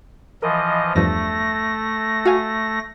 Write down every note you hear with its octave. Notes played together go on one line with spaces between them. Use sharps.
E3 F3 A#4 D#5
E2 G2 F3 A3 A#6
F#4 F5 G#5